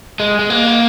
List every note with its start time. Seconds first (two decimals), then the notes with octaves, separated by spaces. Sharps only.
0.20 G#3
0.39 G#3
0.50 A#3